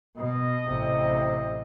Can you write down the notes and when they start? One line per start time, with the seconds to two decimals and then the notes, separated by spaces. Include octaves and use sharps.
0.17 B2 D#5
0.67 A1 C3